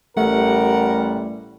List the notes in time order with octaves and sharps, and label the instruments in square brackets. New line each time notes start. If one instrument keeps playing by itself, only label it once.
[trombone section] A1 G3 [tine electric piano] A3 [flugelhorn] A#4 [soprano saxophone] F#5